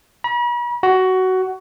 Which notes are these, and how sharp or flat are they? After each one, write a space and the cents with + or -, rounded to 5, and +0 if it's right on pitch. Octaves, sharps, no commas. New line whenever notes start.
B5 -45
F#4 +15